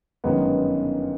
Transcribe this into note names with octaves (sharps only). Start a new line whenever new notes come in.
G1 F#2 D#3 G#3 B3